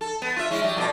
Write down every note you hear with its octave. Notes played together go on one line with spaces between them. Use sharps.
A4
B3
F4 E5
G#3 C#4 E4
F#3 G3
F2 B2 D5